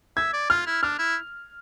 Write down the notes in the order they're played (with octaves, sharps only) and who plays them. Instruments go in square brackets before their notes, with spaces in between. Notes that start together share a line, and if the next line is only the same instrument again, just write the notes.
[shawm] E5 [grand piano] G#6
[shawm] D5
[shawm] F4 [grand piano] F6
[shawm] E4
[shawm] D4 [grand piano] F6
[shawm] E4